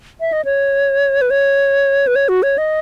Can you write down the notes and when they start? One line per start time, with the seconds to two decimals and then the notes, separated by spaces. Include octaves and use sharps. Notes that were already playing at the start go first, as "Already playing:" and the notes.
0.20 E5
0.33 D#5
0.45 C#5
1.21 B4
1.30 C#5
2.07 B4
2.16 C#5
2.29 F#4
2.43 C#5
2.58 D#5